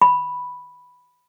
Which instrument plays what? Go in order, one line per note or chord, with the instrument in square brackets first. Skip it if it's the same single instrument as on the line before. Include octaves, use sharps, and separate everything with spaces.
[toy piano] B5